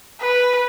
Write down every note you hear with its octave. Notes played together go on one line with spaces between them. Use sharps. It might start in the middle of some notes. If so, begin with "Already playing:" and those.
B4